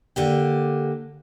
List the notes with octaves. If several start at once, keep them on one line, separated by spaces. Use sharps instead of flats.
D3 A#3 G4